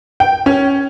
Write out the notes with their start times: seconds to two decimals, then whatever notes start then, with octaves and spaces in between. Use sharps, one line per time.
0.20 G5
0.46 C#4